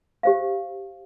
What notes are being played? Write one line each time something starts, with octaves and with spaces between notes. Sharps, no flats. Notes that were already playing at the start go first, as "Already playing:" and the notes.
G4 C5 F5